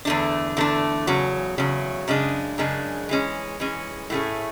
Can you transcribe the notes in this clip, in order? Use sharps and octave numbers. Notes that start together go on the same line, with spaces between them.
E2 D3 A3 D4
E2 D3 A3 D4
E2 C#3 F#3
E2 C#3 F#3
F#2 C#3 G#3 D4
F#2 C#3 G#3 D4
E3 G#3 C#4
E3 G#3 C#4
A2 F#3 A3 C#4 G#4